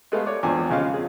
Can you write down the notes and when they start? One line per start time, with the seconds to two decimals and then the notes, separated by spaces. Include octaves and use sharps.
0.12 G#3 A3 B3 F5
0.26 C#5 D5 D6
0.43 G#1 E2 F3 D4 G#5
0.70 D#2 C#3 G#3 F4 F5 C#6
0.94 F2 G#4